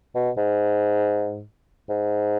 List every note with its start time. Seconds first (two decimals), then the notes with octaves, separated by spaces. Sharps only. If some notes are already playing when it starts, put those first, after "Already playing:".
0.15 B2
0.37 G#2
1.89 G#2